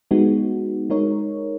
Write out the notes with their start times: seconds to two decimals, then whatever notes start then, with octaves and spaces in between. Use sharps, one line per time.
0.11 G#3 B3 D#4 F#4
0.90 G#3 D#4 A#4 C#5